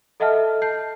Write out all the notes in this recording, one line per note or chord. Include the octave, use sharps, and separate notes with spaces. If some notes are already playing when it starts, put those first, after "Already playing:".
A4 D#5 E5 F#5 A5 F6
A5 G6 C7